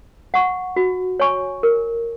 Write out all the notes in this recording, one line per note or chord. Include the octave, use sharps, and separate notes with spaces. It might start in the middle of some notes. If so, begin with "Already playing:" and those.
F#5 C#6
F#4
C#5 G#5 C#6
A#4